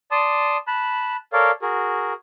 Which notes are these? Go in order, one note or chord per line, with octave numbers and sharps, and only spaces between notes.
D5 A5 C6 D#6
A5 B5 F#6
A4 A#4 C#5 D5 F5
F#4 G#4 A#4